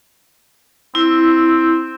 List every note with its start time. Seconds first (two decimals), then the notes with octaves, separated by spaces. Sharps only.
0.95 C4 E4